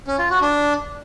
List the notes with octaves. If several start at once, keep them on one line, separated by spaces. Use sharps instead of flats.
C#4
F4
F#4
D4